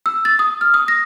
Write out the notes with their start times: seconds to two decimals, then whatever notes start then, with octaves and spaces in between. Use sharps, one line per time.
0.06 E6
0.25 A6
0.39 D#6
0.61 F6
0.74 D#6
0.88 A#6